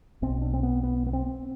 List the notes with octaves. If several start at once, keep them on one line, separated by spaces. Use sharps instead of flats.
B1 B2 C4
D4
C4
B3
B3
B3
C4